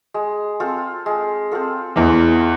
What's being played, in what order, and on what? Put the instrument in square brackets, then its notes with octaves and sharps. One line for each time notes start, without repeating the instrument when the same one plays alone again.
[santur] G#3
C4 F4 A4
G#3
C4 F4 A4
[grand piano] E2 E3 [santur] G#3